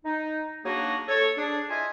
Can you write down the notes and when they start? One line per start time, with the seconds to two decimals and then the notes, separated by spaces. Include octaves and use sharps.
0.05 D#4
0.65 F#3 A#3 D4 D#4 F#4 G#4
1.08 A4 C#5
1.37 D4 G#4
1.69 E4 F4 D#5 E5 G#5